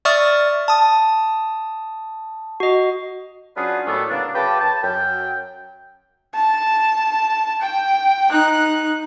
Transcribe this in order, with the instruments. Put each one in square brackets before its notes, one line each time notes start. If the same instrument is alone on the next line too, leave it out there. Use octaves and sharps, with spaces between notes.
[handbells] D5 E5 C#6 D#6 F6 A6
A5 D#6
F#4 D#5
[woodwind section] F#3 C#4 D4 F4 G#4 B4
D#2 A2 F#3 G3 A3 B3
C#3 A#3 B3 D4
F#2 C#3 B4 G5 A5 D6
A5
F#2 G5
[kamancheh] A5
G5
D#4 F#6